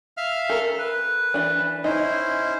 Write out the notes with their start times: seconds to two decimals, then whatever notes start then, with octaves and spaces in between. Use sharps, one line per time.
0.17 E5 F5 F6
0.49 A4 A#4
0.79 B4
1.34 E3 D4
1.84 C#4 D#4 E4 C5